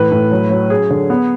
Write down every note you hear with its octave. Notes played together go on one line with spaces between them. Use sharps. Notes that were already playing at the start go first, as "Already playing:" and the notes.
Already playing: A2 E3 B4
A2
F#3
F#3
C#4 G#4
D3
B3